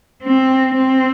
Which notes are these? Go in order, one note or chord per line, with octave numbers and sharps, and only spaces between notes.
C4
C4